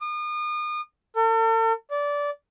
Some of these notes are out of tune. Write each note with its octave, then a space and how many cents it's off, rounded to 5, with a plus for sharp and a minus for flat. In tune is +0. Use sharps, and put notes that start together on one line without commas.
D#6 -40
A4 +45
D5 -20